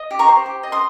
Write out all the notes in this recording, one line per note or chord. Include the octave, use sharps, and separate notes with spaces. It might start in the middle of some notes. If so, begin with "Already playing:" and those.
Already playing: D#5
G4
A#5 C#6
C5
G4
D#5
C6 D#6